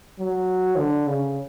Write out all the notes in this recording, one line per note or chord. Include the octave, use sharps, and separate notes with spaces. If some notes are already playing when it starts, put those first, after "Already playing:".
F#3
D3
C#3